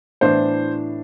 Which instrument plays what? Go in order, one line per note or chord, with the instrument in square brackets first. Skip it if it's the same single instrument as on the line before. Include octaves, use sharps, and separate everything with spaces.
[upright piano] A2 E3 B3 D4 C5